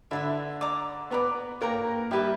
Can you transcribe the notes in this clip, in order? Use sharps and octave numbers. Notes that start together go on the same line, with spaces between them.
D3 D4 E4 B4 E5
D5 A#5 D6
B3 B4 D5 A#5 C#6
A#3 A#4 C#5 G5 A#5
G3 E4 G4 B4 E5 G5